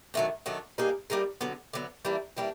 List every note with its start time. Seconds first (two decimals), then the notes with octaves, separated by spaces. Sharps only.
0.14 D#3 F#3 A3 D4
0.46 D#3 F#3 A3 D4
0.78 G3 A#3 D#4 G#4
1.10 G3 A#3 D#4 G#4
1.41 D3 F#3 B3
1.73 D3 F#3 B3
2.05 E3 G3 A#3 D4
2.37 E3 G3 A#3 D4